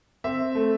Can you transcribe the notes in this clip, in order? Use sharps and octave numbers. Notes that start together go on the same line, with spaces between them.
C4 E5
A3